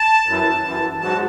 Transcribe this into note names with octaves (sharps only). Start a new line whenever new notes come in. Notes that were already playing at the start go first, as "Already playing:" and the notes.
Already playing: A5
F#2 E3
F#2 E3
G#2 F#3 A5